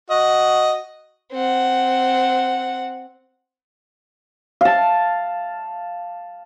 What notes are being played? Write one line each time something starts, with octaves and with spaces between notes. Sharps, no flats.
F#4 D#5
C4 F#5
F5 A5